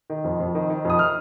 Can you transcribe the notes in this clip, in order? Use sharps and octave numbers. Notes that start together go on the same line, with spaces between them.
D#3
F2
F2
D#3
D#3
F2 D#6
F6